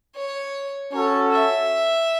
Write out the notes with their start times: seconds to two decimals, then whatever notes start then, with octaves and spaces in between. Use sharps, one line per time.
0.15 C#5
0.92 C#4 F#4 A4 C#5
1.32 E5